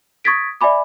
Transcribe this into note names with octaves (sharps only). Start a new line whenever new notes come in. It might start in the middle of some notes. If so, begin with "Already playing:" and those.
C#6 D#6 G#6 A6 B6 D7
D5 E5 G#5 B5 D6